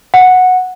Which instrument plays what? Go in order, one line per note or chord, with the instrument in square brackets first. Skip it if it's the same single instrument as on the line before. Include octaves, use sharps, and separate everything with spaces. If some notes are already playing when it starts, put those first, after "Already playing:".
[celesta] F#5